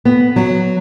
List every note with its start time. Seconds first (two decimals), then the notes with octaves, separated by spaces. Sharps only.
0.05 B3
0.36 F#3